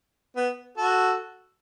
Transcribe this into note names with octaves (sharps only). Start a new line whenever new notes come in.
B3
F#4 A4